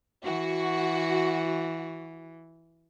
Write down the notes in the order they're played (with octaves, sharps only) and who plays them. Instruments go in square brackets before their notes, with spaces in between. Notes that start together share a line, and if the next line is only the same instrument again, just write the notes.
[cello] E3 [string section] F#4